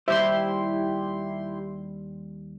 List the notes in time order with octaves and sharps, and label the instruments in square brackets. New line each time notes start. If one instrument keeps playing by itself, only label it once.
[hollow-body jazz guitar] D#2 G3 C5 [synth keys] E4 G4 C6